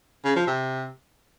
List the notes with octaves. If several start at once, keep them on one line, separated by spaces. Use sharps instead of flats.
C#3
F3
C3